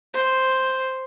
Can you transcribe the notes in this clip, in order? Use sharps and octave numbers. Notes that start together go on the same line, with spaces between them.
C5